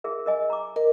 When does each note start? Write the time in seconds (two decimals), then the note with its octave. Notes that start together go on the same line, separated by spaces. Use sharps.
0.04 G#4 A#4 E5
0.26 A#4 D#5 G#5
0.50 A#5 D6
0.76 A#4 D#5